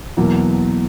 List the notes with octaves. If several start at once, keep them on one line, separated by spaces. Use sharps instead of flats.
E2 B2 F#3 A#3